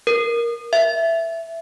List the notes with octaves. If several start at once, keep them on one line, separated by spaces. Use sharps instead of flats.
A#4
E5